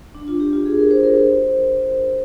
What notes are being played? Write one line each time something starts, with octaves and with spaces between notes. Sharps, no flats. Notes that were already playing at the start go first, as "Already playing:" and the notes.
D4
F4
G4
F4
G#4
A#4
C5
A#4
C5